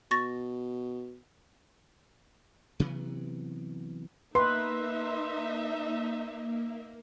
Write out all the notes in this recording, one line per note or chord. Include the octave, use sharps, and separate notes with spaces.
B2 C#6 A6 A#6
C3 E3 F#3 B3
A#3 D#4 B4 E5 C6